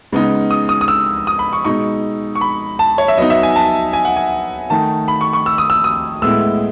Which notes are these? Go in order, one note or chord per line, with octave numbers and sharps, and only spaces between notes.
C#3 G#3 B3 D#4
D#6
D#6
D#6
E6
D#6
B5
C#6
B2 G#3 D#4 C#6
C#6
B5
A5
C#5
E5
F#3 B3 D#4 D#5
E5
G#5
A5
G#5
F#5
G#5
D#3 A3 D#4 A5
B5
C#6
C#6
E6
D#6
E6
D#6
A2 G#3 B3 E4 E6